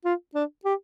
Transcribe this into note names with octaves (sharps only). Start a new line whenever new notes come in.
F4
D4
G4